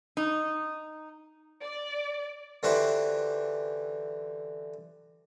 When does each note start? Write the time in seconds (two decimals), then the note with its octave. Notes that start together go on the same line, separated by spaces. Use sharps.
0.17 D#4
1.61 D5
2.63 D3 E3 E4 F#4 G4 C5